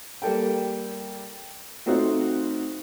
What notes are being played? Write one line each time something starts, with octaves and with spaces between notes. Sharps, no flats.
G3 A#3 A4 G5
A3 C4 D#4 F4 F#4